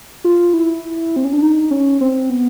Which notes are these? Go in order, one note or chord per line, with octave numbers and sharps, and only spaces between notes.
F4
E4
C4
C#4
D4
D#4
C#4
C4
B3